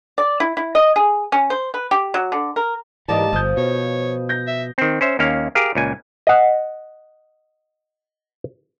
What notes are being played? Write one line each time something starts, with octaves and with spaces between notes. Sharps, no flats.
D5
E4
E4
D#5
G#4
C#4
C5
B4
G4
F#3
D3
A#4
G#2 E3 A#3 G4 D5 D#5 A5
G1 F3 D#6 G6
B2 C#5
G6 A#6
E5
D#3 C4
C#4 C5 E5
D#2 A#3 C#4 F5
G4 G#4 A#4 F5
C#2 A#2 G#5
D#5 F#5